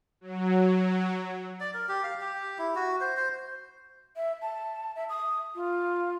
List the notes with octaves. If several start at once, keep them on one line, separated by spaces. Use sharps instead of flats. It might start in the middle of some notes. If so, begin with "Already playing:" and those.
F#3
D5
A#4
G4
F5
G4
E4
F#4
C5
C5
E5
A5
E5
D#6
F4